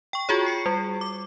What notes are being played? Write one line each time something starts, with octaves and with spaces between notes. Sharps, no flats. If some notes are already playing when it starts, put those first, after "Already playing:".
G5 C#6
F4 F#4 G#4 C#5
C7 C#7
G3
D6